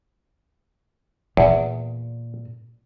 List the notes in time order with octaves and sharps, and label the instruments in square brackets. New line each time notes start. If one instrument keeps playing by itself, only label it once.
[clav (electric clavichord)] E2 [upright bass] A#2